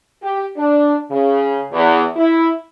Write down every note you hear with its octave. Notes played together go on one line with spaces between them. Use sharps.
G4
D4
C#3
E2
E4